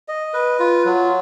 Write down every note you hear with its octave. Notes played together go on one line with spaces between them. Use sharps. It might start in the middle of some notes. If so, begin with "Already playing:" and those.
D#5
B4
F4
F#3